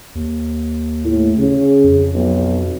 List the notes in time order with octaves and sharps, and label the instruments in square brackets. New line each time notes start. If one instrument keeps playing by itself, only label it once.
[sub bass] D#2
[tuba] A2
C#3
[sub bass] F2
[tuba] B1